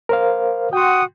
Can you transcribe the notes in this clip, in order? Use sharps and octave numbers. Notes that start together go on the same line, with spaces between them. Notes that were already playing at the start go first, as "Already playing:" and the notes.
A#4 C5 F5
F#4 F#5 G5 C6 D#6